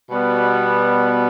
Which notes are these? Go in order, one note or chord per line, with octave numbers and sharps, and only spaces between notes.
B2 G3 B3